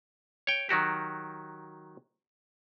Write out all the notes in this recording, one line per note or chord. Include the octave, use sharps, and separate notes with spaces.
C#5 G5
D#3 F#3 F#4 G4